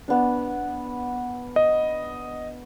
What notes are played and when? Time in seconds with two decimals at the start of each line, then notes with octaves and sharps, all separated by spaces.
0.08 B3 D4
1.56 D#5